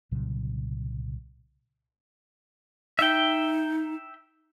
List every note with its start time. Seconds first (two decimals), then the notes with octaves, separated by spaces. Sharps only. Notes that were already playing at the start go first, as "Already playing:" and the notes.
0.11 C2 A#2 C#3 F#3
2.99 D#4 E5 G5